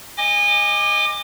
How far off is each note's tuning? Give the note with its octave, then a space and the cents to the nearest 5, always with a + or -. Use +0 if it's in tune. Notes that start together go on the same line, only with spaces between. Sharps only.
D#5 +0 G#5 -25 D6 +25